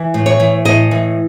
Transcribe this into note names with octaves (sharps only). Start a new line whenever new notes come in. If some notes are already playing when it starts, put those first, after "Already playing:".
Already playing: E3
A2
C#5
E3
A2 D#5
E3